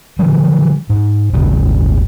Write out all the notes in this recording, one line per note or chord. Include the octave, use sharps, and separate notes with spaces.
D3 E3 F3 G3
G#2
D#1 G#1 C#3